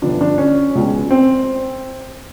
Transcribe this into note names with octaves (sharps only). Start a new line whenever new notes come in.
G1 G2 D3 F3 D4
D4
C#4
C#2 B2 G#3
C4